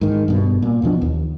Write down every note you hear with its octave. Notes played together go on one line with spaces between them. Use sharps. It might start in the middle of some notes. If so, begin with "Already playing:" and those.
G#2 D#3
G2 B2
A#2
E1 B2 F3 D4
D#2